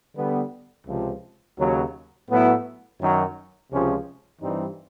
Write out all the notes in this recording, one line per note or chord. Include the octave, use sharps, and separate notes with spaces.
D3 G3 B3
C#2 C3 F3
D#2 C#3 F#3
A2 F#3 B3 E4
F#2 D#3 F#3
C#2 C3 F3 G#3 C#4
G2 E3 G3 C4 D#4